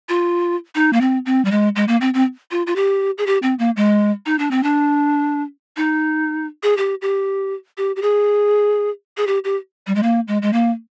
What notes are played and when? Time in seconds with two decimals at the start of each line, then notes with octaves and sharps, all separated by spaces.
0.09 F4
0.75 D#4
0.93 A#3
1.01 C4
1.26 C4
1.45 G3
1.51 G#3
1.76 G#3
1.88 A#3
2.01 C4
2.14 C4
2.51 F4
2.67 F4
2.76 G4
3.18 G#4
3.26 G4
3.43 C4
3.59 A#3
3.76 G#3
4.26 D#4
4.39 D4
4.51 C4
4.63 D4
5.77 D#4
6.63 G#4
6.77 G4
7.02 G4
7.78 G4
7.96 G4
8.02 G#4
9.17 G#4
9.27 G4
9.44 G4
9.87 G3
9.95 G#3
10.03 A#3
10.28 G#3
10.42 G#3
10.53 A#3